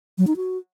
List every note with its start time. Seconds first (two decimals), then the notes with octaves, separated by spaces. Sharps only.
0.18 F#3
0.27 D#4
0.36 F#4